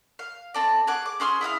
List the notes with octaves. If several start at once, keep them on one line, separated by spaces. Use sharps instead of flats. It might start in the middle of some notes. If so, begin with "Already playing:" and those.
F5
C4 A4 D5
G#4 F#5 D6
D6
C#4 G#4 C6 F6
E4 E5 F5 D#6